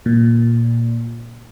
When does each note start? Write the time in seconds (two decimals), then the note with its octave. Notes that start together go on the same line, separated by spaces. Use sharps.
0.06 A#2